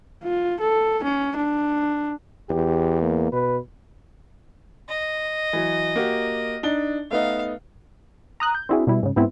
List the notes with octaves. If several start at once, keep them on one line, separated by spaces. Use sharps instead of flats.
F4
A4
C#4
D4
E2 G4
A#3
B2 B4
D#5
E3 F#3
A#3 F#4 G4
D4 D#4 G7
A3 B3 D#4 F5
A#5 D#6 F#6
G6
C4 D4 E4 F#4 G#4
B2 G3 E4
G#2 C#3
G#2 B3 C4 E4